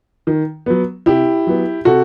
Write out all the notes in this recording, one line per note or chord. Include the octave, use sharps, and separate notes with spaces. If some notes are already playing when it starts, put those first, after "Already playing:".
D#3
F#3 B3
C3 E4 G4
F#3 B3
C3 F#4 A4